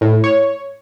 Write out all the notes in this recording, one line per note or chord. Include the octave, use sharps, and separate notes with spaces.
A2
C#5